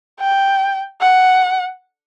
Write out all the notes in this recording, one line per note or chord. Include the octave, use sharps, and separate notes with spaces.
G5
F#5